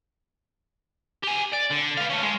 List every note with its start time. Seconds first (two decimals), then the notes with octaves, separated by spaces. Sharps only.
1.24 G4 G#5
1.53 D5
1.71 D3
1.98 B4 F5
2.10 A3 C#4
2.23 G#3